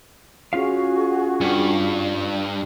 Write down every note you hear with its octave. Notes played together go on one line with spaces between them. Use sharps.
C#4 F4 F#4 G#4 F5 C#6
G2